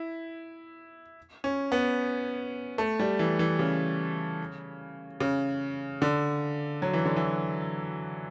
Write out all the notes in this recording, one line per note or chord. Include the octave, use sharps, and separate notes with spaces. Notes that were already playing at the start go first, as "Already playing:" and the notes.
Already playing: E4
C#4
B3
A3
G3
E3
E3
C#3
C#3
D3
F#3
E3
D3
E3